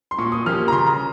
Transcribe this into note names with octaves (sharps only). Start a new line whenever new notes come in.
C6
A#2 C#6
D#6
F3 A#3 C#4 G4 F6
A#5
C#3 C6
A#5